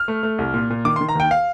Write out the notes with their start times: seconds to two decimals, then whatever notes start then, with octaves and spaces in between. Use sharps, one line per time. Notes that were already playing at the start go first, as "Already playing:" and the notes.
Already playing: F6
0.08 A3
0.23 A3
0.38 C2
0.54 A#2
0.70 A#2
0.85 D#3 D6
0.96 C6
1.01 D#3
1.09 A#5
1.15 D#2 G5
1.31 F5